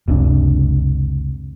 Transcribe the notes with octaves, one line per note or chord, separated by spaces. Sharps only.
F#1 C#2 C3 D4